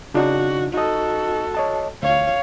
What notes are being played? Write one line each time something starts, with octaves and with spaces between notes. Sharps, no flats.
C#3 D4 D#4 F#4
D#4 F#4 A4 D#5
C#5 D#5 A5
D2 C#5 F5